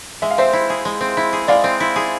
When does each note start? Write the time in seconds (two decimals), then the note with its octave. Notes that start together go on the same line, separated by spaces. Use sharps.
0.22 G#3 E5
0.31 F5
0.38 C4 C5 E5
0.53 E4
0.70 G#4
0.85 G#3
1.01 C4
1.17 E4
1.33 G#4
1.48 G#3 D5 F5
1.64 C4
1.80 E4
1.96 G#4